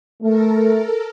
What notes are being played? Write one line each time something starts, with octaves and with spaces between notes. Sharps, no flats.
A3 A4 A#4